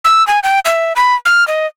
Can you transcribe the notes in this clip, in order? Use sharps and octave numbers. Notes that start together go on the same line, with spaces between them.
E6
G#5
G5
E5
B5
F6
D#5